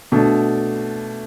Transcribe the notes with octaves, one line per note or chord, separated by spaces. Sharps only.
B2 A3 D4